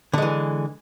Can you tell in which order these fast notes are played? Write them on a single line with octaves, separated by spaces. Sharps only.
D3 G#3 E3